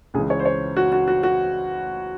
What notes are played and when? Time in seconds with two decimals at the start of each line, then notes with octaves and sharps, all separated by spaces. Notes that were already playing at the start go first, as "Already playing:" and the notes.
0.14 C#2 C#3 E3 G#3 G#4
0.30 C#5
0.40 C5
0.45 C#5
0.77 F#4
0.92 F#4
1.07 F#4
1.23 F#4